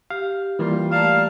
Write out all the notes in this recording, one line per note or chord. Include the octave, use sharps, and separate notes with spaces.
G4 F5
E3 G3 A#3 F4
A3 G4 A#4 D5 F5 A5